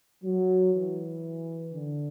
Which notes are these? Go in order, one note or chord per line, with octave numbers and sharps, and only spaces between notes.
F#3
E3
D3